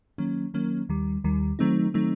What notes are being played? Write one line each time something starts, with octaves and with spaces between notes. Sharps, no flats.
D#3 F#3 A#3 C#4
D#3 F#3 A#3 C#4
D#2 D#3 G3
D#2 D#3 G3
D#3 F#3 A3 C4 D#4
D#3 F#3 A3 C4 D#4